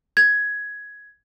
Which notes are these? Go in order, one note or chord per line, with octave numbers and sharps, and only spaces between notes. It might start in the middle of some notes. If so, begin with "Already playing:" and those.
G#6